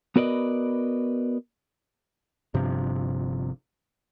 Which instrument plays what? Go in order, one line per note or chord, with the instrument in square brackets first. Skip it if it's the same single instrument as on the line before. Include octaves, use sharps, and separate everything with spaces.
[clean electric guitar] B3 F#4 A#4 B4 D5 D#5
[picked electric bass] G1 G2 C3 F3